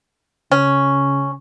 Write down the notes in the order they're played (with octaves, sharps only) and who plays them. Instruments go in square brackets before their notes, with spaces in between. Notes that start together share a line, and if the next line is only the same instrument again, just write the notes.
[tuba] C#3 [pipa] C#4